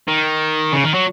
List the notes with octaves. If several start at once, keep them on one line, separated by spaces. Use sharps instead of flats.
D#3
C#3
D#3
F#3